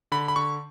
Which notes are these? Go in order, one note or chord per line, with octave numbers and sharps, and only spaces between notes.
D3 B5
B5
D3 C#6